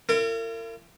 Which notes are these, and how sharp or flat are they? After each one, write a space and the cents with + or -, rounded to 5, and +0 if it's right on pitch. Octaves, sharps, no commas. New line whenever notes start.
E4 +45 A#4 -40